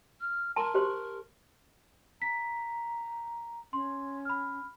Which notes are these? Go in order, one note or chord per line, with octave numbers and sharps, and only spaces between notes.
F6
A#4 A5 A#5 C6
G4 C5 C6
A#5 B6
C#4 C6
B5 F6